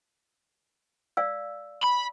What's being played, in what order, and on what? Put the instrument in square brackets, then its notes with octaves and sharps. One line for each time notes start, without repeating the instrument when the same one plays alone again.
[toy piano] D5 F5 E6
[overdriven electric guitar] B5